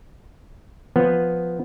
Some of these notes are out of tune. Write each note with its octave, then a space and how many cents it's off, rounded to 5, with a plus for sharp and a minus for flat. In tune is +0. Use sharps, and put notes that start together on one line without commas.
F3 +0 B3 +0